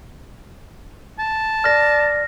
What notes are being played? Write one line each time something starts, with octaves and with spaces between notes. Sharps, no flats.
A5
D5 F6 A#6